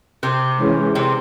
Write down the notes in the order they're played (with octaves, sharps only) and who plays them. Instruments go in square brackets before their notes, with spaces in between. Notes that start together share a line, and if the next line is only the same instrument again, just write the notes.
[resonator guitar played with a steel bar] C3 C4
[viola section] E3 G#3 C#4
[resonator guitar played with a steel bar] C3 C4